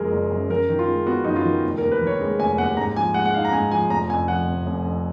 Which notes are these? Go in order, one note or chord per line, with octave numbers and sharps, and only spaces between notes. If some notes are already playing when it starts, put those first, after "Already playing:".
Already playing: F#1 F#2 F3 G#3 G#4 A#4
F#1
F#2
F#2 A#4
D#3
F4
G#3
B3 F#4
F#2 D#4
F4
D#3
F1
A#4
D#2
B4
D#3
C#5
G#3
F1 G#5
D#2 F#5
G#2 A#5
F3 G#5
G#3 F#5
F#5
D#4 F5
A#5
G#2 G#5
F3 G#5
F1 A#5
F2 G#5
F3 F#5
F1
F1
F2